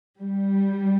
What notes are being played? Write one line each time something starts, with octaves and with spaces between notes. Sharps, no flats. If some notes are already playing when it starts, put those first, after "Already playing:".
G3